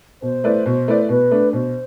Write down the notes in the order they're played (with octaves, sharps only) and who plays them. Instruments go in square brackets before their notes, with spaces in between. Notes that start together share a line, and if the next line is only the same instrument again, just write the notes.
[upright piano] B2 [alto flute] C5
[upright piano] A3 E4 B4 D5
B2
A3 E4 B4 D5
[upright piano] B2 [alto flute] B4
[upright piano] A3 D4
[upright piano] B2 [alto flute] C5